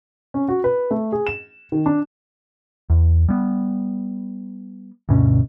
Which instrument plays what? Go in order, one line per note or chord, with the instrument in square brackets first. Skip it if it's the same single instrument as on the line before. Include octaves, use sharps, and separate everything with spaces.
[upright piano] C#4
F#4
B4
A3
G#4
E7
D#3
D4
[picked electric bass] E2
G3 B3
D2 G2 B2 C#4